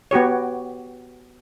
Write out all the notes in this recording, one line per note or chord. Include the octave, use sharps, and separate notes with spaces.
B3 F#4 G4 C#5